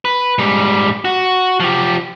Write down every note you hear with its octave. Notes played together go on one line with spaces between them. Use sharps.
B4
G#2 G3
F#4
F3 G4